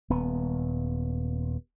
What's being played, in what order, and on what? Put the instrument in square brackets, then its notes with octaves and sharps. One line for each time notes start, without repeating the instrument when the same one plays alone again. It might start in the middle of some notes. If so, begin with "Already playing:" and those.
[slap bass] D#1 B3